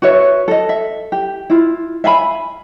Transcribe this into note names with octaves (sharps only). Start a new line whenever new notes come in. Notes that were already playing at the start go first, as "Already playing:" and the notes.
F#4 B4 C#5 E5
A4 D#5
E5
G4
E4 F4
E5 F5 G#5 B5